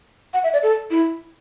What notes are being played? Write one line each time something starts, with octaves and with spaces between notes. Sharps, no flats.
F#5
E5
D5
A4
E4